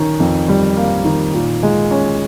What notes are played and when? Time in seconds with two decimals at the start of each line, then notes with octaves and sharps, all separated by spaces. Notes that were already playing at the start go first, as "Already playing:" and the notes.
Already playing: D#3 C#4
0.20 F2
0.48 G3
0.76 A#3
1.05 D#3
1.34 A#2
1.63 G#3
1.91 C#4